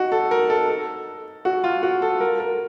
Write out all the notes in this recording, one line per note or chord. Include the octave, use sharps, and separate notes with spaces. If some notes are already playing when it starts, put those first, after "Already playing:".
Already playing: D#4 F#4
A4
A#4
A4
A4
F#4
F4
F#4
A4
A#4
A#4